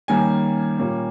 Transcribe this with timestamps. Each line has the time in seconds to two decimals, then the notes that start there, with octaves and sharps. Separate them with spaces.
0.08 D#3 G3 A#3 C#4 G#5
0.78 A#2 G3 A#3 C#4